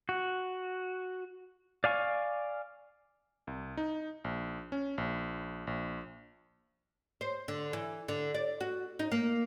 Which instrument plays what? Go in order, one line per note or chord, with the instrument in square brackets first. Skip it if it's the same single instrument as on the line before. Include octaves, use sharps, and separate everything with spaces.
[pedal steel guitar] F#4
D5 F5 G#5 C#6
[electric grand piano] C2
D#4
A#1
C#4
A#1
A#1
[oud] C5
D3
E3
D3
D5
F#4
D#4
A#3